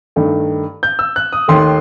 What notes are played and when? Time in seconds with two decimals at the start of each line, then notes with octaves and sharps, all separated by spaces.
0.16 G2 D#3 A3
0.83 G6
0.99 E6
1.16 F#6
1.33 D#6
1.48 D#2 D#3 A3 C6